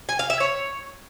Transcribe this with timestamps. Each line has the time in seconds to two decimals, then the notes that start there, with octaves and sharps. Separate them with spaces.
0.09 G#5
0.19 F5
0.30 E5
0.40 C#5